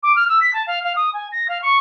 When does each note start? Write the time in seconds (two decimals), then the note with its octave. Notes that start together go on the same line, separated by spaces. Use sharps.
0.03 D6
0.16 F6
0.28 E6
0.41 B6
0.53 A5
0.67 F5
0.84 F5
0.96 D#6
1.13 G#5
1.32 A#6
1.48 F5
1.62 C#6